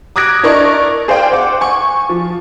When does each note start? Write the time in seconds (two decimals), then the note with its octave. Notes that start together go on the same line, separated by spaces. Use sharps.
0.16 D6 D#6 F#6 G#6 A#6 D7
0.43 D4 E4 A#4 D5 D#5 C#6
1.08 G#4 C5 D5 F5 G5
1.32 C5 F#5 D6
1.61 G#5 C#6
2.09 F3